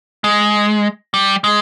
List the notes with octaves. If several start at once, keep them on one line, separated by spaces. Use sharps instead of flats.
G#3
G3
G#3